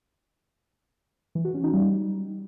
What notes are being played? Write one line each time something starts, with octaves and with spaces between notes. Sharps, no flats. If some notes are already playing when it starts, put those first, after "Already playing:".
E3
F#4
C#4
D#4
G3